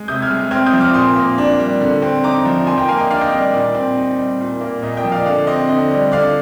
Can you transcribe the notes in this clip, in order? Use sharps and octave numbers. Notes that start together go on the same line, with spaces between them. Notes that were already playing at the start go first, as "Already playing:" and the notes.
Already playing: G#3
C3 D#6 G6
F6 G#6
G#3
C4 F6 G#6
D#6 G6
F3
D6 F6
A#2 C6 D#6
A#3
D4
G3
D3
C4
D#4 A#5 D6
F3
D#3 G#5 C6
G5 A#5
A#3 F5 G#5
D#5 G5
D4 D5 F5
D#5 G5
G3 D#5
D5
A#2 D5
C4
D#4
G3
A#2
A#3
A#2 D#5
D#5 G5
F3
D5 F5
D3 D5 F5
C4 D#5
D3 D#5
G3
D3 D5 F5